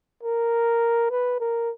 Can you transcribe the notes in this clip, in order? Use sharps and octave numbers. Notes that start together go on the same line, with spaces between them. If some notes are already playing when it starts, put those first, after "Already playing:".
A#4
B4
A#4